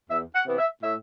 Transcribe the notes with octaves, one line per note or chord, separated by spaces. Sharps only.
E2 E5
F#5
C3 E3 B3
E5
A2 E5